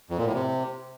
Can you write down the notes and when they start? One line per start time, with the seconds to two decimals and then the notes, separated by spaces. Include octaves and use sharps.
0.10 F2
0.18 A#2
0.26 A2
0.34 C3